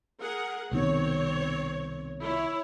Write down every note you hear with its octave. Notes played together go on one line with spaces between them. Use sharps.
G#4 A#4 F#5
C2 B2 D#3 C4 C#5
E4 C#5